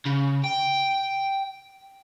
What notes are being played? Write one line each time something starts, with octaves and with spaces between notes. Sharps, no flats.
C#3
G5